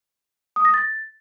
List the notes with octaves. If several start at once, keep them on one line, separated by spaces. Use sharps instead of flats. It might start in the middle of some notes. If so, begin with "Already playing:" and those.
D#6
A#6
A6